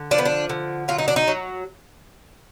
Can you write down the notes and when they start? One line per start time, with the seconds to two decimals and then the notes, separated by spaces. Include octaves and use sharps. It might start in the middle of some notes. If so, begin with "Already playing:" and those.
Already playing: D3
0.11 F3 D4
0.18 B3
0.25 D4
0.49 D3
0.88 F#3 F4
0.99 D#4
1.08 D4
1.16 D#4
1.28 F#3